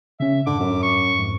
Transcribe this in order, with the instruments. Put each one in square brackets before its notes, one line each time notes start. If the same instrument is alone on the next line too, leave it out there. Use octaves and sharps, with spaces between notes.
[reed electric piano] C#3 C#4 [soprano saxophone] E5
[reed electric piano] F2 G#2 [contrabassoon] D3 [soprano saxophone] D6
[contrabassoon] F#2
[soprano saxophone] C#6
[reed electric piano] F2 G#2